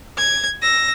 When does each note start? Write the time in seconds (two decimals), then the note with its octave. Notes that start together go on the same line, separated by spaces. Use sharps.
0.17 G#6
0.61 E6 A#6